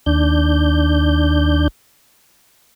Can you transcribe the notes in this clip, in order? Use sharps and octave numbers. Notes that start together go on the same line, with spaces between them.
D#2 D4 G6